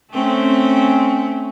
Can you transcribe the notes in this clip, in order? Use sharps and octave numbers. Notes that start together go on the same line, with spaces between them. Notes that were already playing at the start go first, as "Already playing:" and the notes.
A3 C4 C#4